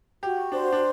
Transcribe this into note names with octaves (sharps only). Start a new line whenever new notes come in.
F#4 G4
D4 C5
D4